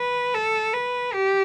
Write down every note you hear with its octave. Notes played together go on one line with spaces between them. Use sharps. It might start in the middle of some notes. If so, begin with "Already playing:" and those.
Already playing: B4
A4
B4
G4